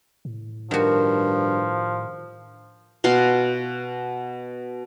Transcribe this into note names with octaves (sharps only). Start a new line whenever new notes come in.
A2
G2 D#3 F3 F#4
B2 F5 C6